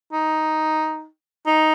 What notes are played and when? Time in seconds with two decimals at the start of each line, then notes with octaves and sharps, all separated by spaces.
0.12 D#4
1.47 D#4